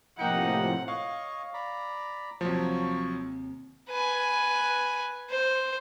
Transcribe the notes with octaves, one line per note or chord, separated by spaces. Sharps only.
A2 C3 F3 A#3 D#4 F#5 G5 C#7
C#5 D#5 F5 C#6
D5 A#5 B5
D#2 C3 F3 F#3 C#5 C#6
B4 G#5
C5